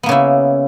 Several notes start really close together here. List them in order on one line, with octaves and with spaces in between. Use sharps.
B3 A#3 C#3 E4